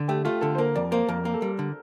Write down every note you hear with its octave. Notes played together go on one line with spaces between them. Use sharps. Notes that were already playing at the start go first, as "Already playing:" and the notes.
Already playing: D3
A3 G4
A3 F4
D3 A4
C5
A#3 A#4
F2 D5
A#3 C5
F2 A#4
A#3
A4
G3
D3